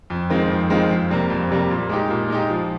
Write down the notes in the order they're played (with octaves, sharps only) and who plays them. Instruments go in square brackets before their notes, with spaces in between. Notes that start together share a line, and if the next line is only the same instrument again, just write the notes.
[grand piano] F2
D#3 G#3 C4 F4
F2
D#3 G#3 C4 F4
F2
C3 G3 A#3
F2
C3 G3 A#3
A#2
G#3 D#4 G4
A#2
G#3 D#4 G4
F3